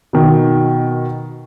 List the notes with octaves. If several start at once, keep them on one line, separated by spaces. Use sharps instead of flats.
B2 D#3